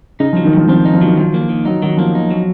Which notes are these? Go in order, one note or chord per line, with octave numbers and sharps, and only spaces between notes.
C#3 D#4
F3
F#3
D#3
G#2 F3
F3 C4
D#4
F3
D#3 F#3
D#3 F3
A#3
D#3
F#3 D#4
D#3 F#3
F3 A#3
D#4
F#3